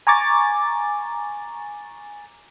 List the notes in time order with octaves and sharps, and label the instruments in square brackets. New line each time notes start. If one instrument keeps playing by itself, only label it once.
[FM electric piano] G#5 A#5 C#6 D6 A6